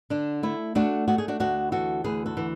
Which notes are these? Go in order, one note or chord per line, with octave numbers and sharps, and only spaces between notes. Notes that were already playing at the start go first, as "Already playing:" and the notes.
D3 D4
A3 E4
A3 D4 F#4
A3 F#4
G#4
D4 F#4
D2 D4 F#4
E3 F#4 A4
D2 G#4 B4
F#4 A4
E3